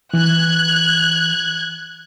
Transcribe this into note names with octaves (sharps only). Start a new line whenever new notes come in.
E3 F#6 G#6